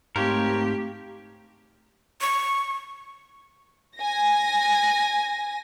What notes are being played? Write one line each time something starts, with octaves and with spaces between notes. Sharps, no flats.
G#2 A3 C4 G4 A#4 C5 C#5 F5
C#6
G#5 A#6